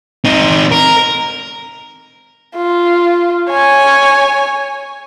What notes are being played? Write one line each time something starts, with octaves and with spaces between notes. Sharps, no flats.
C4 D#4
A#4
F4
C#5 G#5